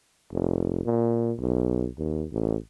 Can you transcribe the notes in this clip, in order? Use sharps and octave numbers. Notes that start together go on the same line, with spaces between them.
F1
A#2
B1
D#2
A1